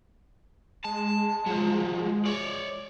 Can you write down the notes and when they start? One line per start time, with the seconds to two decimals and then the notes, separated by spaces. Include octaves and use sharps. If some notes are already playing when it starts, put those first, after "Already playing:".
0.85 G#3 A5
1.46 F3 F#3
2.26 C#5 D5